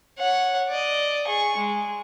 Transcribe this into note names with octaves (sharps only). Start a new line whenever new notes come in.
C#5 F#5
D5 D#5
G#4 C#6
G#3